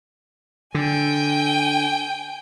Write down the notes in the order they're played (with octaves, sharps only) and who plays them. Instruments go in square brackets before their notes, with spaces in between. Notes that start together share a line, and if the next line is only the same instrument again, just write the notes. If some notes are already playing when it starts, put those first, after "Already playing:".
[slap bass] D3 [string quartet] G5 G#5